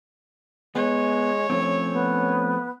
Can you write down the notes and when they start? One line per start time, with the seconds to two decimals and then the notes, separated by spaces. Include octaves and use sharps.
0.76 G#3 B3 C#5
1.50 F3 A3 C4 C#4
1.93 B3